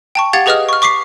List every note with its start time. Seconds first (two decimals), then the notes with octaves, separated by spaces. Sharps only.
0.15 G5 A5 C#6
0.33 G4 F5 F#5 G#6 A6 C#7
0.46 G4 G#4 B4 D#5 D#6 F6
0.69 C#6 F6
0.82 C#6 D6 B6 C7